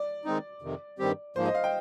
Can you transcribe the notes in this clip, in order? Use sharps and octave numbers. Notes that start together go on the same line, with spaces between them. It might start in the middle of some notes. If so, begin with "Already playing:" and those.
Already playing: D5
D#3 G#3 C4 D#4
F2 C3 D#3
G2 D#3 G3 C4 G4
G#2 F3 A#3 C5
D#5
F5
G5